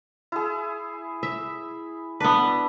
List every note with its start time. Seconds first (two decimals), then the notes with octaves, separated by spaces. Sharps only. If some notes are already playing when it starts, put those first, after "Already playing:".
0.32 E4 G#4
1.23 E5
2.20 B3 D4 E4 B4